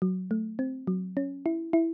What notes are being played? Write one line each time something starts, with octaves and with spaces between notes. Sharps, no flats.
F#3
A3
C4
F#3
C#4
E4
E4